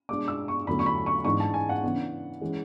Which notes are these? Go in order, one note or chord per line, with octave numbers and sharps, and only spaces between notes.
B2 G#3 D4 D6
E6
C#6
E2 D3 F#3 A3 B5
C#6
B5
C#6
G#2 E3 G#3 B3 D4 C#6
A5
G#5
F#5
C#3 E3 B3 D4
E3 G#3 C#4